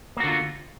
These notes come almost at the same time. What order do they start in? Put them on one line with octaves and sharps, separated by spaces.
A#3 F#4 D3 F4